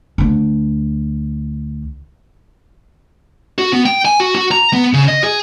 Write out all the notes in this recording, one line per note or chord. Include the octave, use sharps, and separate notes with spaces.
D2 D4
F#4
B3
G5
G#5
F#4
F#4
A#5
B3
C#3
D#5
G#4